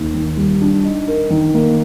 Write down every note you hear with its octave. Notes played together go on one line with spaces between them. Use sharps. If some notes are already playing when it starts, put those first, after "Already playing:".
Already playing: D#2
D#3
G3
D4
D#4
A#4
D#3
A#3